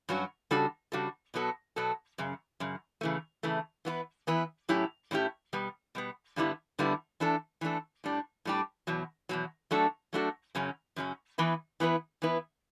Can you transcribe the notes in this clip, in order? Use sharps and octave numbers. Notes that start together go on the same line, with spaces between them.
G2 F#3 C#4 F#4
C#3 G3 D4 F#4 A4
C#3 G3 D4 F#4 A4
B2 F#3 B3 F#4 A4
B2 F#3 B3 F#4 A4
F#2 C#3
F#2 C#3
C#3 E3 A3
C#3 E3 A3
E3 B3 E4 B4
E3 B3 E4 B4
A2 F#3 C#4 E4 G4
A2 F#3 C#4 E4 G4
B2 G3 B3
B2 G3 B3
G2 D3 G3 B3 E4
G2 D3 G3 B3 E4
E3 A3 D4 A4
E3 A3 D4 A4
A2 G3 D4 G4
A2 G3 D4 G4
E2 B2 F#3
E2 B2 F#3
F#3 A3 D4 F#4 A4
F#3 A3 D4 F#4 A4
F#2 C#3 F#3 C#4
F#2 C#3 F#3 C#4
E3 B3 E4 B4
E3 B3 E4 B4
E3 B3 E4 B4